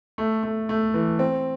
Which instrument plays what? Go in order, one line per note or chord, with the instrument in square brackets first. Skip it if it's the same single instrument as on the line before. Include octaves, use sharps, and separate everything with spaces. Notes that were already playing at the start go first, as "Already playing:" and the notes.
[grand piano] A3
A3
A3
E3
C4